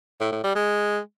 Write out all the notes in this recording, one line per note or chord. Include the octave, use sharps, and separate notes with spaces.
A2
A2
G3
G#3